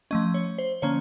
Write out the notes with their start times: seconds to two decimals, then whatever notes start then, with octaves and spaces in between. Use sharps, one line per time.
0.11 F3 A3 C#4 D#5
0.34 C#5
0.58 C5
0.82 D3 F3 A#3 C#4 C#5